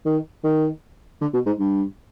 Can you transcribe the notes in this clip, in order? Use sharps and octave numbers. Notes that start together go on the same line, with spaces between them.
D#3
D#3
D3
B2
G#2
G2